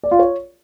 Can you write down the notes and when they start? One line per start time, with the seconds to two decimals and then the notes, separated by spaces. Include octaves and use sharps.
0.03 D5
0.11 F4
0.19 C#5